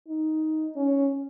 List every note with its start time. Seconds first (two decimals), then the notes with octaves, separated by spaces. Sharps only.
0.08 D#4
0.76 C#4